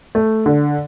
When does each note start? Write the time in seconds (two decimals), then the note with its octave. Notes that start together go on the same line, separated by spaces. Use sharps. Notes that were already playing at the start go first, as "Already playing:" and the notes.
0.15 A3
0.46 D3